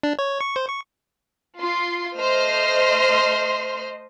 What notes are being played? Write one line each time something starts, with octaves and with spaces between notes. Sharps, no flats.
D4
C#5
C#6
C5
C#6
F4 C6
A3 C5 D#5 C6 F6